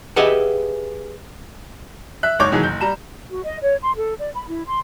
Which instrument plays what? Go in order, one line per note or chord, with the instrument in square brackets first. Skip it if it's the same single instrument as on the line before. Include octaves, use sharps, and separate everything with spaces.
[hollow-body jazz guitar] G4 G#4 B4 D#5 E5 F#5
[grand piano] E5 F#6
F#1 G#2 C#5 D6 G6
B2 D#3 E3 F#3 G#3
F#1 G6
G3 A#5 E7
[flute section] F#4
D#5
C#5
C6
A4
D5
B5
E4
C6